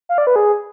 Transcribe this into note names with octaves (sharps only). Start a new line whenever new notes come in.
F5
D5
B4
G#4